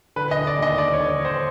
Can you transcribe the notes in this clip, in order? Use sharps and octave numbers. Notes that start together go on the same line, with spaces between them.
D3 B4
D#5
D3
D5
D#2 D#5
D#2 D5
C#5
D3
C#5
D3 C5